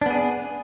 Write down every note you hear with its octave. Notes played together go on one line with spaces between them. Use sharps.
B3 D4 G#4